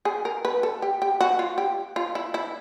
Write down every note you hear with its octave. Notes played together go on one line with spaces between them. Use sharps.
G#4
A#4
B4
A4
G4
G4
F#4
F4
G4
F4
E4
E4